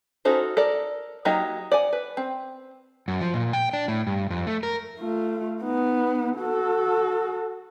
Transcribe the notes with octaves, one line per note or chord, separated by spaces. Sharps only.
C#4 D#4 F#4 A4 C5
A4 A#4 D5
F#3 A#3 D#4 G4 D#5
D5 F#5 G#5
B4
C4
F#2
F3
A#2
G5
D4
A2
G2
F2
A3
A#4
A3 F4
B3 D#4
F#4 A4